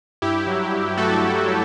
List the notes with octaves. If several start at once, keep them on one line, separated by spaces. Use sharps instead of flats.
G2 E4 G4
F#3
G2
A3 F#4 A4
G2
F#3